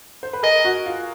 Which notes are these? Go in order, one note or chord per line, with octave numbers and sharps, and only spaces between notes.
C5
B4
G#4 A#4 D#5
F#4
F4